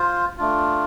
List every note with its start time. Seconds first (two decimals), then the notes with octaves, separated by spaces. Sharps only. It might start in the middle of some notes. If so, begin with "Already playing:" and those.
Already playing: F4 C5
0.37 A3 D4 F4